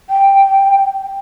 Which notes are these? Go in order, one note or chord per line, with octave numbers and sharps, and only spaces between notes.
G5